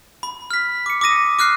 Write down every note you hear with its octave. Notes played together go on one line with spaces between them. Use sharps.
B5
F6 B6
D6 C#7
D6 D#6 A#6 D#7
D6 F6 F#6 C7